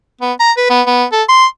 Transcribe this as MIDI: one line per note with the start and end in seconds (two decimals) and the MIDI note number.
0.21 0.33 59
0.40 0.51 82
0.57 0.66 71
0.70 0.82 59
0.87 1.04 59
1.12 1.23 69
1.29 1.45 84